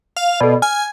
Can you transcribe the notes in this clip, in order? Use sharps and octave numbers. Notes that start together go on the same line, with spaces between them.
F5
B2 A4 D5
G#5 F6